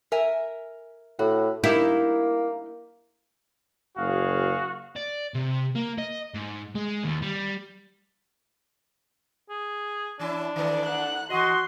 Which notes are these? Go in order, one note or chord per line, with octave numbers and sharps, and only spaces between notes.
A#4 E5 G#5
A2 F#4
A#3 D#4 E4 G4
F#1 F#4 G#4 F5
D5
C3
A#3
D#5
G#2
G#3
D#2
G3
G#4
E3 C#4 D4 E4
D#3 A3 B4 D5
F#5 F#6
E3 F#4 D#5 C6